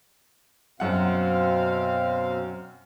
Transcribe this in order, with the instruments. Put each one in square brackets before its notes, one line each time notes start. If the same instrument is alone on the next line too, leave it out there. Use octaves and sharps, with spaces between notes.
[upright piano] F#2 F#5 [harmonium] B2 C4 F5